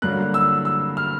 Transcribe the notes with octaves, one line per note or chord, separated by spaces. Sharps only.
G2 D3 F#3 A#3 F#6
E6
E6
F6